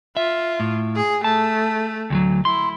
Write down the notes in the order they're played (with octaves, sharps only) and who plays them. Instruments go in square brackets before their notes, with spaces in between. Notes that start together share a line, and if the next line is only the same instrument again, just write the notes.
[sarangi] F4 [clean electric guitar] E5
[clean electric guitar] A2
[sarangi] G#4
[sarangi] A3 [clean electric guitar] A5
[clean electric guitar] D2 F3 F#3
[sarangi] E4 [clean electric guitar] C6